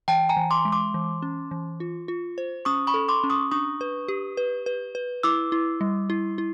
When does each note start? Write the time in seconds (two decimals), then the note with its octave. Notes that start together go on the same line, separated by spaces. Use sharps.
0.08 E3 G5 A5
0.29 G#5 A#5
0.37 E3
0.51 C6 D6
0.65 G#3
0.72 C6 D6
0.94 E3
1.22 C#4
1.51 E3
1.80 F4
2.08 F4
2.38 C5
2.65 C#4 C#6 D#6
2.87 B5 C#6
2.94 A4
3.09 C6 D6
3.24 C#4
3.30 C#6 D#6
3.51 D4 C#6 D#6
3.81 B4
4.08 G4
4.37 B4
4.66 B4
4.95 B4
5.23 E4 D6 E6
5.52 E4
5.81 G3
6.10 E4
6.38 E4